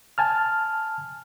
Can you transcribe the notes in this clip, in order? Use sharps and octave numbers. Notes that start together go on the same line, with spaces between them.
G#5 A5 F6